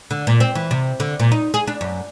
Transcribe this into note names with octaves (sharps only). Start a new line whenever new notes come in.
D3
A#2
C4
E3
C3
D3
A#2
D#4
G#4
D4
F#2